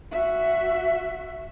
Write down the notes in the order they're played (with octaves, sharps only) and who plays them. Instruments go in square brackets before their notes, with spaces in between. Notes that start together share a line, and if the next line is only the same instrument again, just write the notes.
[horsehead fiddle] F#4 E5